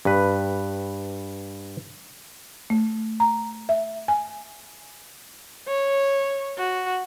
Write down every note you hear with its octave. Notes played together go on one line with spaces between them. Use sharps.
G2 B4
A3
A#5
E5
G#5
C#5
F#4